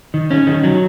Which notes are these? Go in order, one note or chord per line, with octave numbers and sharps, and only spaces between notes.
D#3
C#4
D#3
F#3